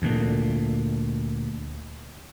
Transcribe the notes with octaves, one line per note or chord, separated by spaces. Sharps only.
D2 A#2